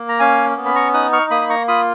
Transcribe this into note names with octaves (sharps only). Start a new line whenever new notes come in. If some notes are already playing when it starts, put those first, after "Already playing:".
Already playing: A#3
A#5
C#4 F5 G#5
B3
B5
A#5 C#6
D#4 D#6 F#6
C#6 F6
A#3 B5 D#6
B5
A#5 C#6
F4 B5 D#6